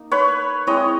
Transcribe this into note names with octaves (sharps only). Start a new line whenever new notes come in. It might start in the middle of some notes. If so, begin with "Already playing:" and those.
Already playing: A#3 D#4
B4 C#5
G#3 C4 E4 C#5 D#5